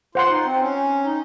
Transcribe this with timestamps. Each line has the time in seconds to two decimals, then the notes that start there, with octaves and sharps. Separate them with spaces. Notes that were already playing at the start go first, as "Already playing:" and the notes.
0.15 F4 C5 F#5 C6
0.30 D#4
0.45 C4
0.60 C#4
1.04 D#4